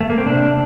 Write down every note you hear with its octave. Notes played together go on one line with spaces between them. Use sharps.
A3
A#3
C4
C3 D4